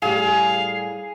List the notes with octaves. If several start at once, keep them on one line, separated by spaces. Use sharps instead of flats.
A2 G3 G4 G#4 F5